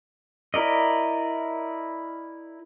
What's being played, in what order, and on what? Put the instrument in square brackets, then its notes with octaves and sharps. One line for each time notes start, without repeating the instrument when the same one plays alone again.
[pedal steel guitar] E4 A#4 D5 D#5